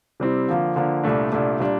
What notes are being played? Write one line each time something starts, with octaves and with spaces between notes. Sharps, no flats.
C3 G3 C4 E4
D3 F3 A#3
D3 F3 A#3
C2 A#2 A3 D4
C2 A#2 A3 D4
A#2 G3 D4